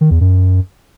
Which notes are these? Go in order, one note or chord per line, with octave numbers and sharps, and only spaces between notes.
D#3
E2
F#2